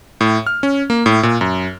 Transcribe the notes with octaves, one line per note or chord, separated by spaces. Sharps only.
A2
F6
C#4
A#3
A2
A#2
F#2